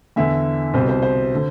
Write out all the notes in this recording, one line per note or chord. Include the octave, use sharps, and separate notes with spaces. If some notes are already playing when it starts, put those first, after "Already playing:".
E2 D3 E5
C2 B2 C5
C5
C5
D3